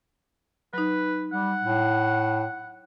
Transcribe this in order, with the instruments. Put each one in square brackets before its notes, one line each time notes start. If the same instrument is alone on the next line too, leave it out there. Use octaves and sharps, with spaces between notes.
[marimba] F#3 D#4 [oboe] B4
[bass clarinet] G3 [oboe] F#5
[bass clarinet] A2